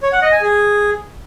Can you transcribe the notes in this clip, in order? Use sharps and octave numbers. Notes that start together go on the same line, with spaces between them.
C#5
F#5
D#5
G#5
G#4